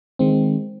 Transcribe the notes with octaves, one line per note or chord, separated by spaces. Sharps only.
D#3 G#3 C4